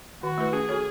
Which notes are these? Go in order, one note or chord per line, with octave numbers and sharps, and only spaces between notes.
D#3 F#4
A3 E4 B4
C#4 G#4
F#4 A4 C#5